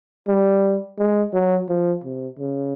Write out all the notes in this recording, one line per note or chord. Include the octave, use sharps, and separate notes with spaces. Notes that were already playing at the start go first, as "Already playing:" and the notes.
G3
G#3
F#3
F3
C3
C#3